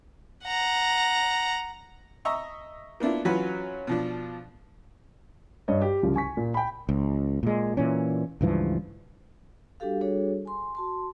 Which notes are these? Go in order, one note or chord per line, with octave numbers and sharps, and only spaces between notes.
F#5 A#5
D#5 E5 A#5 C#6 E6
A#3 B3 D4 E4 F4
E3 F#3 C#4 F4 F#4 B4
B2 F3 D4
G2 C#5 D#5
G4
C2 C#3 F3
G#5 C#6 B6
A#2
G5 B5
C#2
A#2 G#3
A#2 E3 C#4
C#2 G2 E3 F3
G3 D4 F#4 G4 A4 F5
G3 D4 F#4 G#4 A4 C#5
G#5 C6
F#4 A5 C6